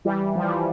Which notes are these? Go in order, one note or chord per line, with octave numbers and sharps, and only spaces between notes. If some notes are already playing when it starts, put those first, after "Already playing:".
E3 G3
F3
E3 G3